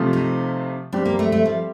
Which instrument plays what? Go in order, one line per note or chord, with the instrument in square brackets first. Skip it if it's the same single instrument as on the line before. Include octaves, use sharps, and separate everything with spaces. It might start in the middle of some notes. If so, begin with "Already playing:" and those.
Already playing: [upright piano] C3 F3 A3 C4 F4
[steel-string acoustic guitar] D#4
[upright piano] G3 C4 G4 [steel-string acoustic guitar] D4
[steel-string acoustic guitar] A#3
A3
A3
F3